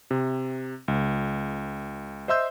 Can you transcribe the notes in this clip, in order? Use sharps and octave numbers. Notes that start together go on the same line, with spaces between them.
C3
C#2
C5 D#5 E5 C6 E6 G6